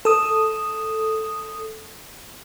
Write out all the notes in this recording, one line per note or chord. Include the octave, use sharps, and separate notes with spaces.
A4 D#6